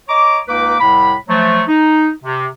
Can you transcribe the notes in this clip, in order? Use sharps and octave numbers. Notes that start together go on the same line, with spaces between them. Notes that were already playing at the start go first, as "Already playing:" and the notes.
C#5 D#5 A#5 D6
C#2 A#3 D#4 B4 D6
C2 A2 C3 B5
F3 F#3 A3
D#4
C3